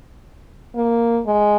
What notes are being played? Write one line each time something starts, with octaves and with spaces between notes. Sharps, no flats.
A#3
G#3